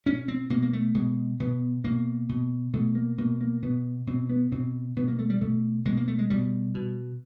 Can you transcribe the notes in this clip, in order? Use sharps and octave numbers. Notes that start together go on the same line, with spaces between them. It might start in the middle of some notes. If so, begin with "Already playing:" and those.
B2 C#4
C4
B2 A#3
A#3
A3
B2 G#3
B2 B3
B2 A#3
B2
B2 A3
A#3
B2 A#3
A#3
B2 B3
B2 C4
B3
B2 C4
B2 B3
A#3
A3
G3
B2 A3
B2 G#3
A#3
A3
G#3
B2 G3
B2